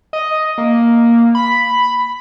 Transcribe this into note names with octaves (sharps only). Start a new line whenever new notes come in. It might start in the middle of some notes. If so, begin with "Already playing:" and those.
D#5
A#3
B5